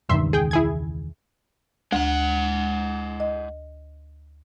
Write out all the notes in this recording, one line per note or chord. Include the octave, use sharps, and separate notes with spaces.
E1 C#2 G2 D#3 E5 C6
G#4 G5
E4 G#4 G#6
D2 G#3 F#5
D#5